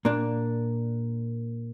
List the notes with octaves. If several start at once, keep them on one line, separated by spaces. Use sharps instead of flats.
A#2 A#3 D4